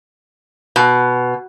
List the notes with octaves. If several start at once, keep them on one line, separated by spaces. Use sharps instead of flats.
B2